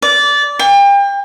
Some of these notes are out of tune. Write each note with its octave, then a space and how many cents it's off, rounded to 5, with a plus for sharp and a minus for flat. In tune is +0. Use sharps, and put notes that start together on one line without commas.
D5 -20
G5 +35